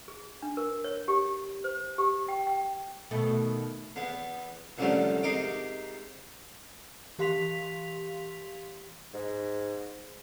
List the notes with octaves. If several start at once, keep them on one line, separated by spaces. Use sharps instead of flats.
G#4
D4
A#4
C#5
G4
C5
G4
G5
G5
B2 D#3 A3
E2 B3
C2 F#2 D3 F3 G3 A3
G#2 C3 D#4 A#4 D#5 D6
E3 G4 F5 C6 B6 F7
G#2